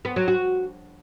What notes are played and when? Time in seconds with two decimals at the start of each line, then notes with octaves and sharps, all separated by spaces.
0.05 B3
0.16 F#3
0.28 F#4